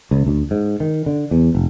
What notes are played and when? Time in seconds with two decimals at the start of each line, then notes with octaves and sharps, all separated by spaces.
0.11 C#2
0.26 D2
0.51 G#2
0.80 D#3
1.06 D3
1.31 E2
1.55 F1